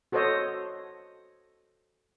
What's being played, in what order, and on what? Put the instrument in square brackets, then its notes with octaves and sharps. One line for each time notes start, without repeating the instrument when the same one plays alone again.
[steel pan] F#4 A4 C5 C#5 D#5